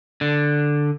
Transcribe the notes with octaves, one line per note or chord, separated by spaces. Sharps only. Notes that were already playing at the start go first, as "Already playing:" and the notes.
D3